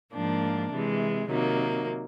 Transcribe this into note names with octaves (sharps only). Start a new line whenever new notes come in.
G#2 F3 A#3 D4
C3 E3 G#3
C3 D#3 F#3 A#3